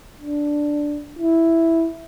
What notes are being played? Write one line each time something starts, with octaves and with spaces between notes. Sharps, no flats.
D4
E4